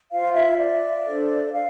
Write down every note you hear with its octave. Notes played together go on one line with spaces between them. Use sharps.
F4 C5 F5
E5
D5
D4 A4 C5
F5